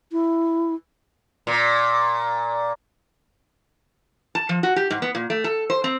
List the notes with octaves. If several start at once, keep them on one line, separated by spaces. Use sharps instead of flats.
E4
A#2
A5
F3
F#4
G4
G#2
B3
A#2
A3
A4
C5
C4